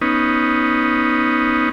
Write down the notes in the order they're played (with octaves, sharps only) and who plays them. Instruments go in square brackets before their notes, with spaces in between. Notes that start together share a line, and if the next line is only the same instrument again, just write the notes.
[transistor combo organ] B3 C#4 D#4